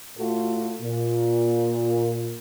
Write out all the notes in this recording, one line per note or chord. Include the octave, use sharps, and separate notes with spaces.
A2 A3 F4 F#4 A4
A#2